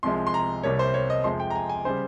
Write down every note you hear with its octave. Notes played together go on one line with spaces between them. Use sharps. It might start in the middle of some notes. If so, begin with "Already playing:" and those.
C2 C3 F3 G#3 C6
C6
A#5
C2 C3 G3 A#3 C#5
C5
C#5
D#5
F2 C3 F3 G#3 C6
G5
A#5
G#5
G#5
C#3 G3 C5